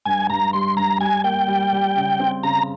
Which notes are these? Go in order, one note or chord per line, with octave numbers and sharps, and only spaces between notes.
G2 G#5
G2 A#5
G3 C6
G2 A#5
G3 G#5
A#3 G5
G3
G3
C#3
C4
C#3 A#5